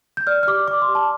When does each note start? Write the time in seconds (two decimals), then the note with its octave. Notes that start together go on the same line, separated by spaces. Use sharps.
0.17 G6
0.27 D5 F6
0.43 F6
0.47 G4 D6
0.68 D5 D6
0.82 C6
0.88 G4
0.95 A5